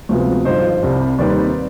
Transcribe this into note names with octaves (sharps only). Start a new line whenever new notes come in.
D2 C3 F3 G#3 B3
G#1 G2 D3 F3 C5 D#5
C2 C3 G3
D#2 D#3 G3 C4 D#4 B4 D5